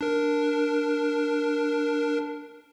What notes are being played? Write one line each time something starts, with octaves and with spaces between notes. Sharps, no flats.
D4 A#4